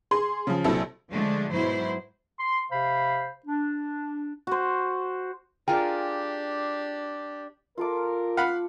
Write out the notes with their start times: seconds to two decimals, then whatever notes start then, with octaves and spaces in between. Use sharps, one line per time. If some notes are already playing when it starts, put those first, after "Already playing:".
0.11 G#4 C6
0.47 C#3 F3
0.65 A#1 C3 F#3 C4 E4 A4
1.12 D3 F3 G#3 A3 D4
1.51 G#2 B2 F#3 E4 C5
2.39 C6
2.71 C3 C5 F5 B5
3.46 D4
4.47 F#4 C5
5.68 D4 F4 G4 G#4 A#4 G5
7.78 F4 A4 A#4 D6
8.37 F5 F#5 B5